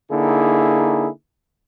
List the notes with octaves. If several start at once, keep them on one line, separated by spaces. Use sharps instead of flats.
D3 A#3 D#4 E4 G#4